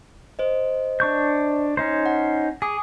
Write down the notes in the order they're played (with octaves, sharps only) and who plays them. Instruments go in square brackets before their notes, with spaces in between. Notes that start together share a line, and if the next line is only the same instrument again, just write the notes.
[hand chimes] C5 D#5
[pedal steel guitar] D4 C#6 G6
C#4 D#4 C5
[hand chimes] F#5
[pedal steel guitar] G#4 [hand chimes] G#5 D6 D#6